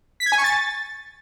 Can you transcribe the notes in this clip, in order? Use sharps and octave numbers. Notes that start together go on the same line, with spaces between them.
B6
G#6
G#5
C#6
A6